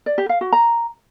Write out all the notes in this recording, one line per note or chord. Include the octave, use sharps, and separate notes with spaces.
D5
G4
F5
F#4
A#5